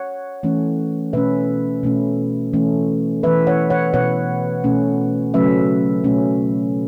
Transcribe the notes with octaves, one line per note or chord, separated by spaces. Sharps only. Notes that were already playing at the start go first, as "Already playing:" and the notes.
Already playing: C#5 F#5
E3 A3 C#4
B2 A3 C#4 B4 E5
B2 A3 C#4
E3 A3 C#4
E3 B3 B4 E5
C#5 F#5
C#5 F#5
B2 B3 C#5 F#5
B2 A3 C#4
C#3 F#3 A3 C#4 B4 E5
B2 A3 C#4